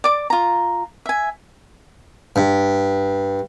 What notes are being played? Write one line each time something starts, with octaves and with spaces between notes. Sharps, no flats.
D5 D6
F4 A#5
E5 G#5
G2